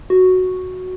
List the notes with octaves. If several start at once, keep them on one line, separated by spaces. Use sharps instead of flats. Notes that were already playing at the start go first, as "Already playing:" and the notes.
F#4